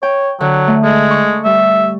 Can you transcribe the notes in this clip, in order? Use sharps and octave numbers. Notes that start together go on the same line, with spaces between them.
C#5 G5
D3 F#3
A3
G#3 A4
C#6
G3 E5